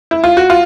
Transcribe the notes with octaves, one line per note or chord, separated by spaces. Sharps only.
E4
F4
F#4
F4